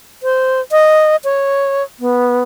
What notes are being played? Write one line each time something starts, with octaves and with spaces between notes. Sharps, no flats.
C5
D#5
C#5
B3